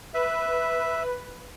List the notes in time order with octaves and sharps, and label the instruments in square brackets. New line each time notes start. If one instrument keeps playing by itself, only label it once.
[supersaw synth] B4 [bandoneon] E5